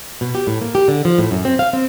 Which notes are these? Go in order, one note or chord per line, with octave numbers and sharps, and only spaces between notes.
B2
G4
A2
A#3
G4
D3
F3
A2
F#2
C4
F5
C4